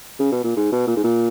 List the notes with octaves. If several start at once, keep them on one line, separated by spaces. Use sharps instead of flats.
C#3
B2
A#2
G#2
B2
A#2
G#2
A#2